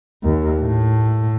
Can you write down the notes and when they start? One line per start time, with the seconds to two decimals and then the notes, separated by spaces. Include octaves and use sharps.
0.23 D#2
0.60 A2